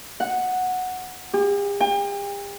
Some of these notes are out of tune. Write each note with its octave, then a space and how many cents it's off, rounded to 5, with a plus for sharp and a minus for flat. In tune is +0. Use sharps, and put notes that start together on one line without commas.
F#5 -5
G4 +45
G5 +40